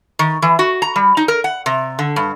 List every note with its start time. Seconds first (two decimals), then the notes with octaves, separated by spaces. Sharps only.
0.19 D#3
0.42 E3
0.59 F#4
0.82 A#5
0.96 G3
1.17 D#4
1.28 A#4
1.44 F#5
1.66 C3
1.99 D3
2.16 G2